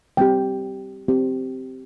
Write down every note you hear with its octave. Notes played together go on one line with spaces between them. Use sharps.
G3 C4 G4 G5
C4 G4